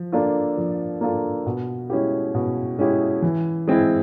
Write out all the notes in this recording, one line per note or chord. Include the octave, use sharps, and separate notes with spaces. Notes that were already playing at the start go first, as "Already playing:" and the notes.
Already playing: F3
A#3 D4 F4 A4
F3
A#3 D4 F4 A4
B2
G#3 C#4 E4 G4
B2
G#3 C#4 E4 G4
E3
G#3 C4 E4